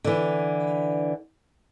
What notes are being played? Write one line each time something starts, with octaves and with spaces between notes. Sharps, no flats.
D3 E3